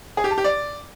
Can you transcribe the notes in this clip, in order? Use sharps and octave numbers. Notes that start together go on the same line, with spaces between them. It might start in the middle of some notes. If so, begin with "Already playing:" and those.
G#4
G4
A5
G4
D5